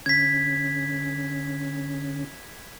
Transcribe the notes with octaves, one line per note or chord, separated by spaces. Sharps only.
D3 C#4 G#6 B6